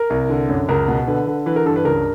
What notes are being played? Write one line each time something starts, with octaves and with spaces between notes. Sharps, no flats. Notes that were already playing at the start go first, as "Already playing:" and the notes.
Already playing: A#4
C2
D3
F#2
C#2 A#4
B2
D3 B4
D3
E3 B4
A#4
G2 A4
B4
C#2 A#4